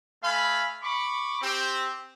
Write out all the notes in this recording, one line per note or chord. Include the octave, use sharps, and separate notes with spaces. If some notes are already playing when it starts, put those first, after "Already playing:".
A3 F5 G#5 B5
B5 C#6 D6
C4 G4